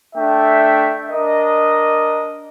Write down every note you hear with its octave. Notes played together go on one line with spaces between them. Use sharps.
A3 D4 E5 G5
D4 A#4 D#5